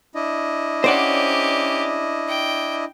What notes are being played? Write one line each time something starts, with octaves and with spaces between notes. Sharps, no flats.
D4 E4 D#5
C#4 G4 C5 D5 F#5
G5